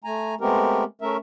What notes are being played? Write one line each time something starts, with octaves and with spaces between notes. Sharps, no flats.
A3 G#5 A#5
G#3 A3 B3 C4 G4 A#4
A3 C#4 A#4 E5